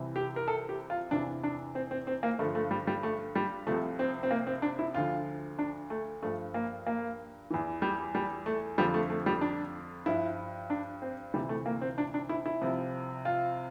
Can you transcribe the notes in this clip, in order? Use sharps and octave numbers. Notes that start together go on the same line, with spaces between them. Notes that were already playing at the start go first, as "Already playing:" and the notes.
Already playing: C2 C3 E3
G4
A#4
A4
G4
F4
E2 C3 E3 D4
D4
C4
C4
C4
A#3
G2 D3 F3 A3
A3
G3
G3
A3
G3
C2 C3 F3 A3
C4
C4
A#3
C4
D4
E4
D2 D3 F3 F4
D4
A3
G2 F3 A3
A#3
A#3
E2 E3
G3
G3
A3
F2 D3 F3 G3
A3
A3
G3
D4
G2 F3 E4
D4
C4
D2 C3 E3 G3
A3
A#3
C4
D4
D4
E4
E4
C2 C3 F3
F4